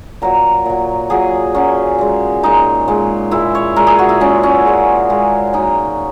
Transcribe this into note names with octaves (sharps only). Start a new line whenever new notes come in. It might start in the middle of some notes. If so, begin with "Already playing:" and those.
A#2 F#3 A#4
A#2 F#3
A#2 F#3 G#4
A#2 F#3 C#4
A#2 G#3
A#2 G#3 D#4
A#2 G#3
A#2 G#3 E4
C#5
A#2 G#3 A#4
G#4
F#4
E4
A#2 G#3 C#4
C#4
A#2 G#3
A#2 G#3
A#2 F#3 D#4